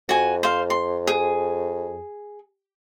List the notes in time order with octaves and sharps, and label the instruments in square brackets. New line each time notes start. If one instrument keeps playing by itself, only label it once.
[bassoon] F2 [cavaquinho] F#4 G#5
[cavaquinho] C5 F5
C6
G#4